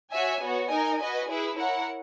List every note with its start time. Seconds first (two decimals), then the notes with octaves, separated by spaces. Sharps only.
0.12 F#4 C#5 E5 G#5
0.41 B3 F#4 C#5
0.70 D#4 A#4 D#5 G#5
0.98 F#4 B4 D#5 G#5
1.28 E4 G#4 B4
1.57 E4 A#4 C#5 F#5